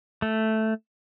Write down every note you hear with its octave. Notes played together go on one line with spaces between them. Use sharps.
A3